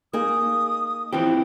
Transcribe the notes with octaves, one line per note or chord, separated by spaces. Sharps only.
A#3 D#4 G#4 D#6
E3 F3 C4 G4